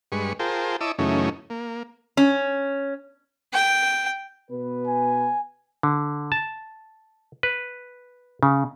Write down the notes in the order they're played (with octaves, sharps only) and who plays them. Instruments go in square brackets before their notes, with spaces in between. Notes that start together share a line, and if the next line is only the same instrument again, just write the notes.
[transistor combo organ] G2 G#3 B4 C#6
F4 G#4 A#4 C5 G5 A5
E4 C#5 D#5 A5 D6 E6
F#2 C#3 E3 A3 C#4 D#4
A#3
[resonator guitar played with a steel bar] C#4
[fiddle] G5
[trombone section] B2 B3 B4
[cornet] G#5
[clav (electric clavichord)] D3
A5
B4
C#3